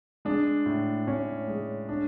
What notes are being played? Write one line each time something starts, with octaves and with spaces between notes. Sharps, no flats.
G#3 D4
A2
A2 C#4
G#3
D4